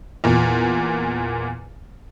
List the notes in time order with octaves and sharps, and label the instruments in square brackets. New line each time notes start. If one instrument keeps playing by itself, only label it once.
[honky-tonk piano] E2 A#2